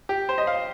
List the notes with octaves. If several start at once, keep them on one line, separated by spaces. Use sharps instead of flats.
G4
C5
D#5
F5